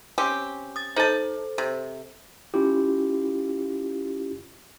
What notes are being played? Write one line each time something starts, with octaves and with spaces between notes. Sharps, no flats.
C4 C#4 G4
D#6 A6
D#4 A4 C5 A5
C3
C#4 E4 F4 G4